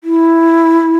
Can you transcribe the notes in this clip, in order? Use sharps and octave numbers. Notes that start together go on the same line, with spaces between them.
E4